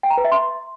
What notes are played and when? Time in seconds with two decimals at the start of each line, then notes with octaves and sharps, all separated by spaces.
0.03 G5
0.10 A#5
0.17 B4
0.25 E5
0.32 C6